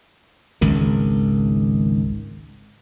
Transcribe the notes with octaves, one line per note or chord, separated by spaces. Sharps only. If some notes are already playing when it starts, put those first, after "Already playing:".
G#1 C#2 D#3